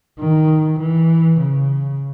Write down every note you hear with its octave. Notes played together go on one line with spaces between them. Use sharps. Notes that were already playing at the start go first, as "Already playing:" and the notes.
D#3
E3
C#3